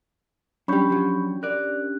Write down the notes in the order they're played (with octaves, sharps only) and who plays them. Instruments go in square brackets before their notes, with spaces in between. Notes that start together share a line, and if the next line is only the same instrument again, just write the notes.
[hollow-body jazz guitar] F#3 G3 [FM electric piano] C#4 D4 G4 [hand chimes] B5 C#6 G6
[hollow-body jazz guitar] F3 F#3
[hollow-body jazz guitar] A#4 D5 [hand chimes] F#6